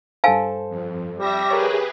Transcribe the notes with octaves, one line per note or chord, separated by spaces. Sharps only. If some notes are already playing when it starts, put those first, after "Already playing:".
G2 A4 C5 F5 G#5 A5
F2
G3 E5 A#6
G4 G#4 A#4 B4 C#5